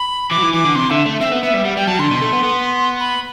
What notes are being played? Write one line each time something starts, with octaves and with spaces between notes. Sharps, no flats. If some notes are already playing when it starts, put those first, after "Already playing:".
Already playing: B5
E3 D6
F#3
E3
E3 D6
D3
C3 C6
D3 E5
A3
C4 E5
B3
B3 E5
G3
G3 F#5
G3 G5
F#3 A5
D3 C6
B2
A3
B3
B3
B5